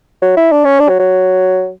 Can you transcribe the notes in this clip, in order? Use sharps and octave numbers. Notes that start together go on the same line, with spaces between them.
F#3
E4
D4
C#4
D4
F#3
F#3